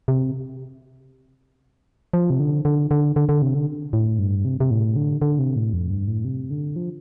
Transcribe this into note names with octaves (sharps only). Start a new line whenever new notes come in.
C3
F3
C3
D3
D3
D3
D3
D3
C3
D3
A2
G2
C3
C3
A2
D3
D3
C3
A2
F2
G2
A2
C3
D3
F3